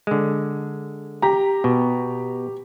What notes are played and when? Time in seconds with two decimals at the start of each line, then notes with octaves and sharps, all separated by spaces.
0.07 D3 G#3
1.22 G4 A#5
1.64 B2